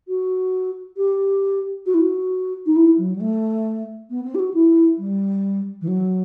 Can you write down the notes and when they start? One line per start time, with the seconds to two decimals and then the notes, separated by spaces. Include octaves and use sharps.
0.08 F#4
0.97 G4
1.86 F#4
1.94 E4
2.01 F#4
2.66 D#4
2.76 E4
2.98 F#3
3.15 G3
3.20 A3
4.10 B3
4.24 C4
4.35 G4
4.39 F#4
4.54 E4
4.98 G3
5.81 E3
5.88 F#3